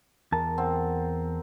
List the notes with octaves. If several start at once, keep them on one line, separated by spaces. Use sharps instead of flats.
E2 A#4 A5
C4 F#5